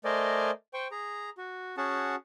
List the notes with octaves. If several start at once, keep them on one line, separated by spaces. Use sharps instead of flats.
A3 A#4 C5 D5 D#5 G#5
C5 G5 C#6
G#4 A#5
F#4
C#4 F#4 G#4 F#5 A5